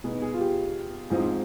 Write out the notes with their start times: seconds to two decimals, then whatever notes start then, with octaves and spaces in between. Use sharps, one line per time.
0.04 B2 B3 D#4 G#4
0.22 G#4
0.34 F4
0.39 G4
1.10 G#2 F3 C4 D#4 G#4